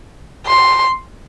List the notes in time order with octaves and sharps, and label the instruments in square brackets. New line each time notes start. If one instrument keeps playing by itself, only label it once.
[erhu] C6